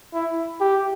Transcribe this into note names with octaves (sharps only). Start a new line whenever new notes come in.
E4
G4